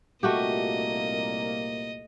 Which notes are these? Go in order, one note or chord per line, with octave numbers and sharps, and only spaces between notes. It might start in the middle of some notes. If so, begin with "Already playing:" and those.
C2 A#2 A3 A#3 F#4 G4 D#5